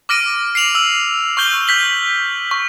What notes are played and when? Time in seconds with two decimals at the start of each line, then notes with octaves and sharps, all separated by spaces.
0.09 D6 F6 A#6 D7 D#7
0.55 C7 D7 F7 F#7
0.75 E6 F#7
1.37 C#6 F6 G6 G7
1.68 G6 B6 F#7
2.51 C#6